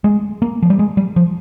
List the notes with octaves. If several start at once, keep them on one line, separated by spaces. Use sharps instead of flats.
G#3
A#3
F3
G3
G#3
G3
F3